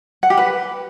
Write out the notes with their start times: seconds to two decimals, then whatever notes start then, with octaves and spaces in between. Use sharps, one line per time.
0.23 F#5
0.30 G4
0.38 B4